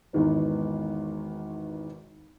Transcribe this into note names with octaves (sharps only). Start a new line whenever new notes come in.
G#1 E2 D#3 B3